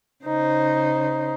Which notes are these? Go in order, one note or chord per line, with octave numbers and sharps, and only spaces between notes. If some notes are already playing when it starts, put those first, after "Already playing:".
C#3 D#4 C5